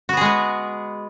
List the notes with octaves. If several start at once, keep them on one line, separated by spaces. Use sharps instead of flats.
G#3 B3 F#4 G#4 B4